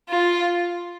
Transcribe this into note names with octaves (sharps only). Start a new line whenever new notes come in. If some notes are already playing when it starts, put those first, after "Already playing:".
F4